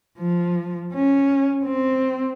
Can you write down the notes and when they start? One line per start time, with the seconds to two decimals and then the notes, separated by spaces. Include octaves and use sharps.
0.18 F3
0.94 C#4
1.64 C4